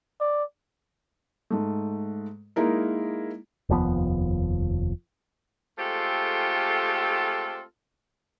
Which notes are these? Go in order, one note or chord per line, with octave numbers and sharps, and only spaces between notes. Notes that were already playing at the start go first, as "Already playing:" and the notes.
D5
G#2 A3
G#3 A#3 D#4 E4 A#4
F1 D#2 F3 B3
G#3 A3 C4 F4 G4 A4